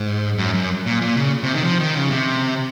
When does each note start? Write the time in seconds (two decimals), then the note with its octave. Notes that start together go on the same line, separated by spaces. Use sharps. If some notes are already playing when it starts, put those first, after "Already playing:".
Already playing: G#2
0.38 F#2
0.54 F#2
0.86 A#2
1.01 A#2
1.17 C#3
1.43 C3
1.53 D#3
1.64 F3
1.80 D#3
1.96 C#3
2.11 C3